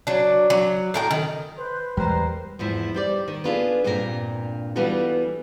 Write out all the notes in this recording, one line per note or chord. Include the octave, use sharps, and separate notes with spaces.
F#3 D4
F#3
A2 A#4 G5
D#3
B4 C5
E2 G3 G#3 A#4 C5
E2 G#2 F3 E4
G3 C5 D5
D#3
B3 D4 F4 G#4 A4
G2 A#2 A#3 C4 F#4 A#4
E3 G3 B3 F4 F#4 A4